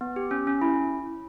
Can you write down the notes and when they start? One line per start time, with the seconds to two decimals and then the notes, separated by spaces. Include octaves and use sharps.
0.01 B3
0.16 G4
0.31 C#4
0.47 C#4
0.61 E4